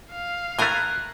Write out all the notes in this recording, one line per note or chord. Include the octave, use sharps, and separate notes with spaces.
F5
A2 A3 A#4 G#5 F#6